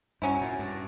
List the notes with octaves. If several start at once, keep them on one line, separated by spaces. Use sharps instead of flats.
G2 F#3 C#4 E4
A#2
G2